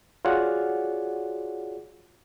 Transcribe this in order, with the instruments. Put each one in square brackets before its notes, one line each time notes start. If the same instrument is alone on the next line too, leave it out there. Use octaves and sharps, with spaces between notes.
[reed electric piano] F4 F#4 G#4 C#5 D5 F#5